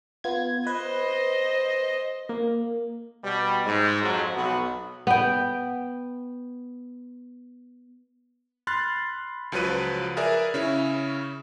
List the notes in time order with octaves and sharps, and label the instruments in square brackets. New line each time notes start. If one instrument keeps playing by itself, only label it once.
[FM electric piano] B3 F4 G#6
[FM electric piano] B4 [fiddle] C5 D#5
[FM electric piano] A#3
[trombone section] B2 G3
G#2
F2 G#2 F#3
B1 B3 F#4
[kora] B3 G5
[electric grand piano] B5 C6 F6 F#6 A6
C#2 F3 F#3 B4 D#7
G#4 A#4 B4 D5 E5 G#5
C#3 C#4 E4